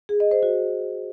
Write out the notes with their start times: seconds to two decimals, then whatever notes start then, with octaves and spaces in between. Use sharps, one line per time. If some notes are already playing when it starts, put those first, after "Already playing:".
0.09 G#4
0.20 D#5
0.31 C5
0.43 F#4